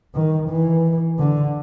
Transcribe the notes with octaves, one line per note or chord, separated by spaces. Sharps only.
D#3
E3
D3